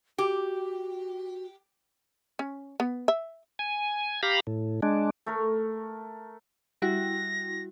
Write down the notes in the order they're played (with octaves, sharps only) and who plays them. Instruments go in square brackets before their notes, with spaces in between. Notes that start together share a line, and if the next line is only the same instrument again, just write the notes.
[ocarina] F#4 [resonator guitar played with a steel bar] G4
[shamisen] C#4
B3
E5
[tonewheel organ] G#5
G4 F5 A#5 B5
A2
G#3 D4
[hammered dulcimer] A3 A#4
[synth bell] G3 E4 F#4 [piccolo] A#6